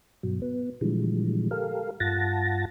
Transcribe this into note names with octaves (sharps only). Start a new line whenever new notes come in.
G2 B2 F#3
B3
A#2 D3 E3 F3 G3 G#3
G4 A4 A#4 F5
G2 F4 F#5 A5 A6 A#6